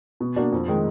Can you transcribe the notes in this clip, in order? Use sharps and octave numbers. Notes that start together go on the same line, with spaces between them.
B2
A#3 D4 F#4
F2
D#3 G#3